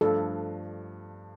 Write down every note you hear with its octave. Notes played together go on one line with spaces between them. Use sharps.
G2 F3 A3 D4 A4